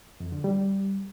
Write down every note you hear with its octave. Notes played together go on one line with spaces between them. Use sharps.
F2
D3
G3